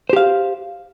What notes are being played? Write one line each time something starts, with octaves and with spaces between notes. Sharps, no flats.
G4 C5 F5